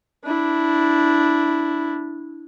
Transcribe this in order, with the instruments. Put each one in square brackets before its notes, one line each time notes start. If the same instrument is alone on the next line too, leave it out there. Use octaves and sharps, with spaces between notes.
[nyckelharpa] D4 E4